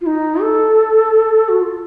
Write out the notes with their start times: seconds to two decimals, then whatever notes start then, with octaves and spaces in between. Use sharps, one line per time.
0.01 F4
0.06 D#4
0.42 A4
1.49 F#4
1.61 F4